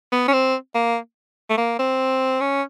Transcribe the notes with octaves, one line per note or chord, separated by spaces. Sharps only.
B3
C#4
C4
A#3
A3
A#3
C4
C#4